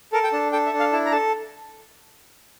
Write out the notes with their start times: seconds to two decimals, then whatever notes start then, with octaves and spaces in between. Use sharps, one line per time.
0.13 A4 A#4
0.24 G5
0.33 D4 A5
0.52 A4 G5
0.66 E5
0.73 D4
0.79 F5
0.92 E4 A5
1.06 A#5
1.12 A4 A5